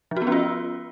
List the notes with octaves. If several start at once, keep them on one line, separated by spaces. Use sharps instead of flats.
F3
F#4
B3
C#4
F4